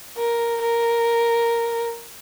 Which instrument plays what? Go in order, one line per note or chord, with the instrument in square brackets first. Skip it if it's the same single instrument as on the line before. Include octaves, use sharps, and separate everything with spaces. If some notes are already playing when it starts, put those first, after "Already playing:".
[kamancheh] A#4
A#4